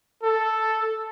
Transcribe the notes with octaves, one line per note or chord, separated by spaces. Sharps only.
A4